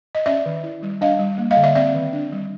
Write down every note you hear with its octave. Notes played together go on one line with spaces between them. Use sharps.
D#5
C#4 D5 E5
D#3
E4
G3
D4 D#5 F5
G3
A#3
D#5 F5
D3
D5 E5
C4 D5 E5
D#3
D4
G3